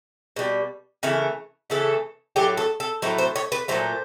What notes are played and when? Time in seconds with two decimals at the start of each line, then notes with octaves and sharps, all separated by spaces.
0.36 B2 G3
1.03 C#3 E3 A3 A#4
1.70 C#3 E3 A3 A4
2.36 A2 F#3 A3 G4
2.57 A4
2.80 A4
3.02 A2 F#3 A3 C5
3.18 C5
3.36 C#5
3.52 B4
3.68 A#2 F#3 A3 C5